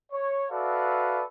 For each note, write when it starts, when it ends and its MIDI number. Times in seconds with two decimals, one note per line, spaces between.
0.12 0.45 73
0.50 1.22 66
0.50 1.22 69
0.50 1.22 71
0.50 1.22 74
0.50 1.22 76
0.50 1.22 77